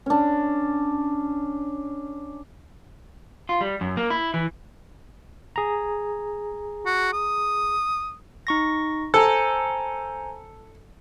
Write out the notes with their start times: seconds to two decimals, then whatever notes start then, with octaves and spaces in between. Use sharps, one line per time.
0.06 C#4 D4
3.49 F4
3.61 G3
3.81 F#2
3.97 A#3
4.10 E4
4.34 E3
5.56 G#4 A#5
6.86 F#4
7.13 D#6
8.47 D#4 C#6 A#6
9.14 A4 C5 G#5 A#5